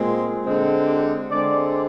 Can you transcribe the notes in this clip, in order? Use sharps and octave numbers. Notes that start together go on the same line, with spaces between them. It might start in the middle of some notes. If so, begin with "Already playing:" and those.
Already playing: A#2 G#3 C4
D3 G#3 C4
G4
D3 G#3 C4 D5